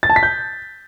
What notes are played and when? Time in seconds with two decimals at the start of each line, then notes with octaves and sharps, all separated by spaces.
0.03 A6
0.10 A5
0.16 B6
0.23 G6